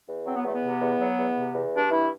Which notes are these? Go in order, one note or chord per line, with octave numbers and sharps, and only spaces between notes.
E2
F#3 C4
B3
E2 A3
B3
C3
E2
F#3
E2
C3
E2
G2 D4
E3 E4